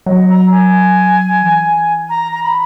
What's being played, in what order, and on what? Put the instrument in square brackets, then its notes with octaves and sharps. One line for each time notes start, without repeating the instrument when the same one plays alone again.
[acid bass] F#3 [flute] D#5
[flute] A#5
G#5
[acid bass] E3
[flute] A#5
A#5
B5